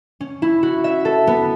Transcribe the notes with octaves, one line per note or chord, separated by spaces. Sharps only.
C#4
E4
F#4
E5
A4
B3